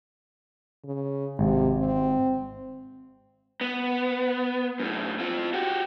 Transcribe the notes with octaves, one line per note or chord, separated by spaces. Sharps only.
C#3
G#1 C3
C4
B3
F#2 A2
C4 F4
F#4 G4